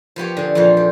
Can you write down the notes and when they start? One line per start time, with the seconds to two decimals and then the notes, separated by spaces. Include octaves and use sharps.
0.16 F3 B3 G4 C#5
0.37 D3 G#4
0.55 F2 A#2 E3 F3 F4
0.77 G4